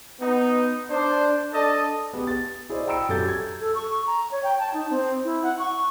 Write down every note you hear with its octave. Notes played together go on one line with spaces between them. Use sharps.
B3 D#4
D4 C5
D4 A4 D#5 A5
B3 G4 G#4
A6
E4 G#4 C5 D5 D#5
G5 A#5 B5 E6 C#7 D7
F#2 F#3 G4 A4 G6 A6
G#6
A4
C#6
A#5
C#5
G5
A5
D#4
C4
E4
F#5
C#6